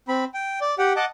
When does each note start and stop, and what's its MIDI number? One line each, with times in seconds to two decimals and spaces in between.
0.08 0.24 60
0.08 0.24 83
0.34 0.59 79
0.61 0.75 74
0.78 0.93 67
0.78 0.93 78
0.78 0.93 79
0.96 1.05 75
0.96 1.05 78
0.96 1.05 81
0.96 1.05 86